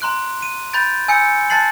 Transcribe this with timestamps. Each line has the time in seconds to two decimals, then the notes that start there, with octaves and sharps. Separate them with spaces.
0.01 A#5 C6 F#6 D7
0.42 D#7
0.73 B5 G6 A6 D7
1.08 G#5 E6 G6 C#7 D7
1.50 A5 F#6 A6 C7 F#7